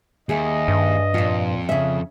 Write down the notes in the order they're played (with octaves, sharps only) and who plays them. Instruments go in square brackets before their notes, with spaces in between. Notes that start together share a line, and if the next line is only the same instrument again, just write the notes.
[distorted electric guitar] D#2 [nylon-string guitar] G#4 E5 [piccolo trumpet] D#5
[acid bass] G2
[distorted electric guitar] F2 [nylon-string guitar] A#2 F4
[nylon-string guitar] C#3 E5